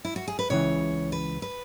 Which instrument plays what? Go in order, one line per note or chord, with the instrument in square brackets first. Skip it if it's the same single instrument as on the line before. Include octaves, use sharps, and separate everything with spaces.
[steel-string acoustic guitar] E4
F#4
G#4
B4
[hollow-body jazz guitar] C#2 C#3 E3 [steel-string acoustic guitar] C#5
[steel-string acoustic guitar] B4
B4